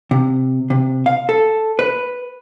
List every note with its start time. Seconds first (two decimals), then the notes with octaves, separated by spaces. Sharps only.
0.11 C3
0.70 C3
1.06 F5
1.29 A4
1.79 B4